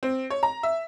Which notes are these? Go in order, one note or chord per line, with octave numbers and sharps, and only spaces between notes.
C4
C#5
A#5
E5